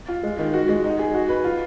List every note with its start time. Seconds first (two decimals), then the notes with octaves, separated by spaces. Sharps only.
0.08 F4
0.23 G#3
0.39 D#3
0.54 F#4
0.69 G#3
0.84 D#4
0.99 G#4
1.15 F#4
1.29 B4
1.44 F4